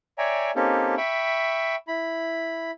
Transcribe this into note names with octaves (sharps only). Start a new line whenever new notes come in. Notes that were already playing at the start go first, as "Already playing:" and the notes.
C#5 D5 E5 G5 G#5 A#5
A#3 C4 C#4 D#4 G4 A4
E5 G5 B5 C#6
E4 B5